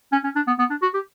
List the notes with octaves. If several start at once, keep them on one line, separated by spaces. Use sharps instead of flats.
C#4
C#4
D4
B3
B3
D4
F#4
G4